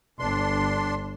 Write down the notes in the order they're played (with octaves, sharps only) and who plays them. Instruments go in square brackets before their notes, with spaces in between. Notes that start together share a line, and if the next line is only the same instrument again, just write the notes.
[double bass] G1 [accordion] D4 C6